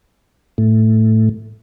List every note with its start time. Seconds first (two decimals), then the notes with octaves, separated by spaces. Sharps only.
0.58 A2